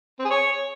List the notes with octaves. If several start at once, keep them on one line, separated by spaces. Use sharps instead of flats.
C4
G#4
C#5